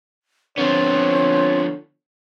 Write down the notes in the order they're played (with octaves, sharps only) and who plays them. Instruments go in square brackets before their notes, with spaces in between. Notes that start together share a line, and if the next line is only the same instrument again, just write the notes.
[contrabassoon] D3 [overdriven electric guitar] F3 B3 [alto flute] C4 [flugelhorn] C#5